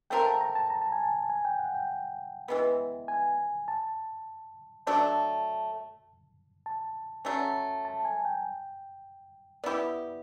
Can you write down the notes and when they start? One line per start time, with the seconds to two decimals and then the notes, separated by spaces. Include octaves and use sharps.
0.10 A3 C4 F4 A#4 G5
0.26 A5
0.41 A#5
0.55 A5
0.70 A#5
0.82 A5
0.92 G#5
1.03 A5
1.30 G#5
1.45 G5
1.59 F#5
1.75 G5
2.48 E3 G#3 B3
3.08 G#5
3.68 A5
4.87 F#3 A3 D4 A5
6.66 A5
7.25 F#3 A3 C#4
7.85 A5
8.05 G#5
8.25 G5
9.64 B3 E4 G4 D5